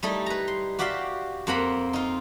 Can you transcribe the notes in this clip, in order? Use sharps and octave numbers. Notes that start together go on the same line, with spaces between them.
G3 A3 D#4 E4
B4 A#5
C6
F#4 G4 D5 E5 F5 G5
F2 A#3 C4 F#5 A#5 B5
D#4 F4